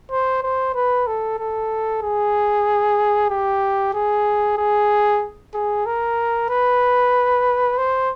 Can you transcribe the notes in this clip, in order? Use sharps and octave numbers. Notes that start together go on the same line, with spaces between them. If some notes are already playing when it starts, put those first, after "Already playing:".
C5
C5
B4
A4
A4
G#4
G4
G#4
G#4
G#4
A#4
B4
C5